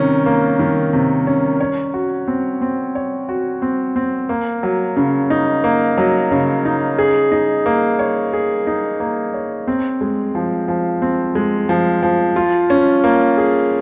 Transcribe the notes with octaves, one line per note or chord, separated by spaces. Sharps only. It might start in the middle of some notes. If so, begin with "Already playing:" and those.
Already playing: C3 D#3 C#4
A#3
D#3
C3
C#4
C#5
F#4
C4
C4
C#5
F#4
C4
C4
A#3
F#3
C#3
D#4
A#3
F#3
C#3
D#4
G#4
D#4
A#3
C#5
G#4
D#4
A#3
C#5
C4
G#3
F3
F3
C4
G#3
F3
F3
F4
C#4
A#3
G#4